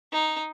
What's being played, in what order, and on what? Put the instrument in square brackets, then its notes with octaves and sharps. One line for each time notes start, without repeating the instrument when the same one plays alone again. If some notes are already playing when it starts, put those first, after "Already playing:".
[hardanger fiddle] D#4